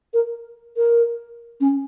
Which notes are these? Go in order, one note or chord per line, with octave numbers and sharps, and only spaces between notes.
A#4
A#4
C#4